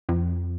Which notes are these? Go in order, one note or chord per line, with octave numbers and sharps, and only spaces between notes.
F2